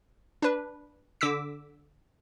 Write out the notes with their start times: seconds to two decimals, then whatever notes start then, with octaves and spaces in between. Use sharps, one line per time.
0.42 D4 B4
1.21 D3 D6 E6 B6